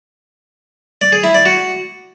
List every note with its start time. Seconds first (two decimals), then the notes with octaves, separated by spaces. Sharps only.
1.02 D5
1.13 G#4
1.24 E4
1.35 D5
1.46 F#4